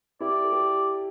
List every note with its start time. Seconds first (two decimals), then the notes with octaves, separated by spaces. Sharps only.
0.20 E4 G4 D5
0.44 A4
0.53 G4